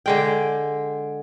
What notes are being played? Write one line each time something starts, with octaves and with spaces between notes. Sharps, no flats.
D3 G#3 G5